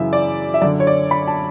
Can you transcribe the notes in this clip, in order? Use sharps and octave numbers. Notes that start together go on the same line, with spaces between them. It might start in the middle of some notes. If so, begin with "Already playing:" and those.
Already playing: F#2 C#3 E3 E5
D5
E5
F#2 D3 D5
C#5
D5
B5
A5